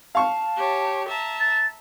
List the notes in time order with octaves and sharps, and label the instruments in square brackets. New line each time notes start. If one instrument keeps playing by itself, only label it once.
[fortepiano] F5 C#6 [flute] A5
[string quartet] G4 C#5
E5 A5 A#5
[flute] A6